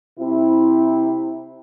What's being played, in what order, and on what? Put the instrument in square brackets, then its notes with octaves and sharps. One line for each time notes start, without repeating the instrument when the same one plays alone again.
[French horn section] C3 C4 E4